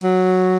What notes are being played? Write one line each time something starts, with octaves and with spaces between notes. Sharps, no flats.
F#3